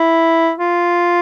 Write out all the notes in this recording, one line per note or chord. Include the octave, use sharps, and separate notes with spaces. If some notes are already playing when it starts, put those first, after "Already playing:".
Already playing: E4
F4